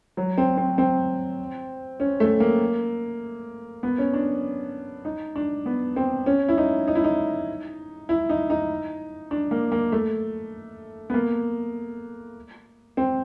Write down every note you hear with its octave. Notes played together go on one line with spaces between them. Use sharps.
F#3
C4
C4
C4
C#4
A3
A#3
B3
C#4
D4
D#4
D4
B3
C4
C#4
E4
D#4
D#4
E4
D#4
E4
D#4
D#4
D4
A#3
A#3
A3
B3
A#3
C4